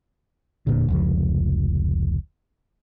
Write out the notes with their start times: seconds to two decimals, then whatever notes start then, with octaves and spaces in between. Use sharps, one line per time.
0.67 E1 A#2 D3
0.88 F1 C#2 F3